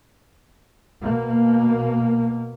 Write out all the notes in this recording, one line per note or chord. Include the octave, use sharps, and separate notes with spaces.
B2 A#3